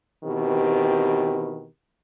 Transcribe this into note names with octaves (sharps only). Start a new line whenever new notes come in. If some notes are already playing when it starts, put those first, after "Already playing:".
B2 D#3 E3 C4 G4